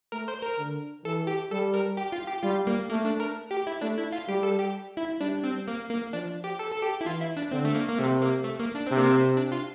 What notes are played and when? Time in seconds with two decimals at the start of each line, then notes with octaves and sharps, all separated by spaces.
0.12 A3 A#4
0.28 C5
0.42 A#4
0.58 D3
1.05 E3 A4
1.27 G4
1.51 G3 A4
1.74 A#4
1.97 G4
2.12 F4
2.27 G4
2.43 G3 F4
2.67 A#3
2.90 A3 A#3
3.05 D4
3.20 A#4
3.51 G4
3.67 E4
3.81 A3 D4
3.98 E4
4.12 F4
4.28 G3 G4
4.43 A4
4.59 G4
4.97 E4
5.20 G3 D4
5.44 C4
5.68 A#3
5.90 A#3
6.13 F3 D4
6.44 G4
6.59 A4
6.72 A4
6.82 G4
7.01 E4
7.06 E3 F4
7.21 E4
7.37 D4
7.51 D3 C4
7.65 A3
7.75 A#3
7.89 A#3
7.98 C3 A3
8.22 A#3
8.44 A3
8.59 A#3
8.75 D4
8.87 C3 C4
8.97 A#3
9.07 C4
9.37 D4
9.52 F4